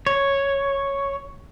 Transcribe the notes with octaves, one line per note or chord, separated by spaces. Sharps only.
C#5